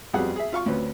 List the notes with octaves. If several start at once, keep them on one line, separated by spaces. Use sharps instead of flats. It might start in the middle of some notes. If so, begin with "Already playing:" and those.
F2 F#3 G3 B3 G#4 F#5
G#4 E5
F4 F5 C#6
D2 C4 C#4 B4